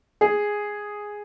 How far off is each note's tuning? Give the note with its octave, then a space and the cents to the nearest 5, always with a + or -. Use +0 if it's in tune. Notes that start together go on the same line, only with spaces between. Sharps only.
G#4 -5